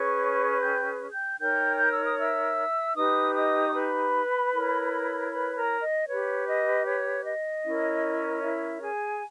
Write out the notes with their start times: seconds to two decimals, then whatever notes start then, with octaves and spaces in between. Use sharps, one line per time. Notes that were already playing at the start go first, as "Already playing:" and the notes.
Already playing: C#4 G#4 B4 C#5 C#6
0.61 G5 G6
1.13 G5 G6
1.39 D#4 A#4 C#5 G5 G6
1.78 G6
1.92 E6
2.05 D#6
2.18 E5 E6
2.95 D#4 G4 B4 D#5 D#6
3.34 D#5 D#6
3.68 C#6
3.73 B4 B5
4.52 E4 A#4 C#5
5.30 B4 B5
5.56 A#4 A#5
5.82 D#5
6.08 G4 B4 C#5
6.48 D#5
6.86 C#5
7.25 D#5
7.64 C#4 E4 A#4 C#5
8.43 E4 E5
8.81 G#4 G#5